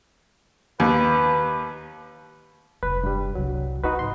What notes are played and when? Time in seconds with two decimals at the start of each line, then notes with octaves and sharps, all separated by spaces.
0.80 D#2 B4
2.83 F1 D4 B4
3.04 G2 G3
3.35 C2 F#3
3.83 D#4 E4 F#4 B4
3.99 G#2 C6